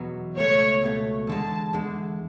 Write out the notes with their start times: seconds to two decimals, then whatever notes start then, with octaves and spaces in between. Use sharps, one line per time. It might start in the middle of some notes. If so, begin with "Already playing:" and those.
Already playing: E2 B2 F#3 B3
0.37 C#2 B2 A3 C#5
0.82 C#2 B2 A3
1.27 E2 D3 G#3 A5
1.73 E2 D3 G#3